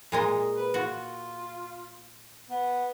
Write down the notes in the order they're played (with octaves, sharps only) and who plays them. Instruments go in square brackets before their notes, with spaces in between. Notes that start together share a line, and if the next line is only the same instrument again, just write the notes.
[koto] A#2 G#3 D#5
[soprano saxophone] B4
[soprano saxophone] F4 [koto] F#4
[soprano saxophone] B3